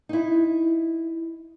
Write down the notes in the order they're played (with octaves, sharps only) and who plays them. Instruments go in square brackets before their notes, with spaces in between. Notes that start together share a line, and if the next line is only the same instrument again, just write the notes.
[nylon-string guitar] D#4 E4